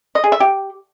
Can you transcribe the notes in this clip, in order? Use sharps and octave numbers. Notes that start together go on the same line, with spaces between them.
D#5
G#4
E5
G4